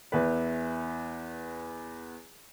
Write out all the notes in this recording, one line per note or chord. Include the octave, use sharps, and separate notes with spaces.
E2 E4 B4